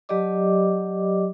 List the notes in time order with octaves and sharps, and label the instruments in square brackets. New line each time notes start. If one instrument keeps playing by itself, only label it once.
[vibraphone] F#3 G4 D5 D#5 D6